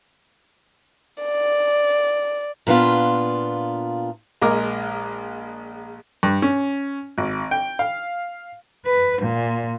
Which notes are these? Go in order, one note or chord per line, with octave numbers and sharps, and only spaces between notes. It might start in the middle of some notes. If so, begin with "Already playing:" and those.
D5
A#2 B3 D4 F4
A#1 G#3 A#4 D6
G2
C#4
G#1
G5
F5
B4
A#2